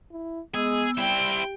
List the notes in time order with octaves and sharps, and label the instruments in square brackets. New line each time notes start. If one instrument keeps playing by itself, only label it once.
[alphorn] E4
[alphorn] G#3 [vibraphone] B3 E6 [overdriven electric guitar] G#4
[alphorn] G3 [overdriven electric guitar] C4 E4 [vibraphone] G4 [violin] G5